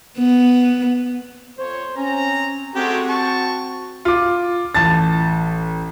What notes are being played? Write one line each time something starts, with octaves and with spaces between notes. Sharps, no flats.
B3
F2 C5 C#5
C4 C#4 A#5
G#3 A3 C4 F#4 G4
A5 C#6
F4 D6
A1 A5 A6